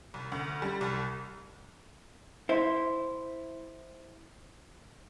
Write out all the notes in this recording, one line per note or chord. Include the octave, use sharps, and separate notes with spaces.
C2
D2
G3
C2
E4 C5